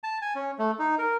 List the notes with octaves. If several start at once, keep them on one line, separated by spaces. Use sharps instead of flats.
A5
G#5
C#4
A3
D#4
A#4